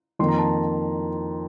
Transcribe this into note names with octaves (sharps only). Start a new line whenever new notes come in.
F2 D#3 A#3 C6
A#5
A5
A#5